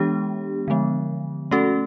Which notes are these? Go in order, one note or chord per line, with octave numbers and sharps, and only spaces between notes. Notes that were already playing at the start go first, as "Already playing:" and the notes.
Already playing: E3 G#3 B3 D4 G4
D3 F3 G#3 B3
A3 C#4 F#4 A4